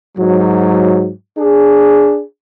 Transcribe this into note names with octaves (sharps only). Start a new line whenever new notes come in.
G#2 F#3
D4 G#4